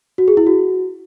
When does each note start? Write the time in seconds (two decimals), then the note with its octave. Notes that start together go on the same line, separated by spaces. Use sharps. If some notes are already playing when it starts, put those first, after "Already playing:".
0.18 F#4
0.28 G#4
0.37 E4
0.47 F#4